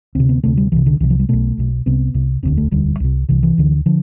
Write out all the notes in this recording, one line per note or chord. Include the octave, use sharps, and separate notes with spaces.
D2 C3 C4
B3
D2 C3 A3
G3
C2 C3 E3
D3
C2 C3 E3
F3
G3
B1 B2 A3
B1 B2
C2 C3 B3
C2 C3
E1 D2 D3 C4
A3
E1 D2 D3 G3
C2 C3
C2 C3 E3
E3
D2 D3
D3 F3